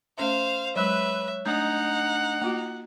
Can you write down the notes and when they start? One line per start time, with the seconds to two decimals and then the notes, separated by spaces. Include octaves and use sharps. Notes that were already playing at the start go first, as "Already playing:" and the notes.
0.18 A3 C#4 C5 E5 F5
0.76 F#3 G#3 B4 C#5 E5 F#6
1.46 A3 D4 D#4 F#5 G6
2.42 A#3 F4 F#4